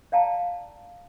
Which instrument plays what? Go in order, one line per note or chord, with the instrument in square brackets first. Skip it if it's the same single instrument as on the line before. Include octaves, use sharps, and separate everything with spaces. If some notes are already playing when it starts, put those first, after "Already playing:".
[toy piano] D5 F5 G5 A5 A#5